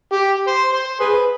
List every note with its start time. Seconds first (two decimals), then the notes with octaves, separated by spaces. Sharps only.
0.12 G4
0.47 C5
0.73 C5
1.00 G#4 B4